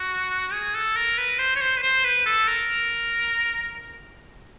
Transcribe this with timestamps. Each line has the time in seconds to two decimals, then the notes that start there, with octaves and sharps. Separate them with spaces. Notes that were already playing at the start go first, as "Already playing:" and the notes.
Already playing: F#4
0.52 G#4
0.75 A4
0.96 A#4
1.18 B4
1.39 C5
1.56 C#5
1.61 C5
1.77 B4
1.82 C5
2.04 B4
2.26 A4
2.48 A#4